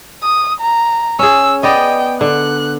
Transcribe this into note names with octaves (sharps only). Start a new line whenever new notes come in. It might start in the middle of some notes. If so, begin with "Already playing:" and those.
D#6
A#5
C#4 G#4 E6
B3 D5 D#5 G5
D3 F#6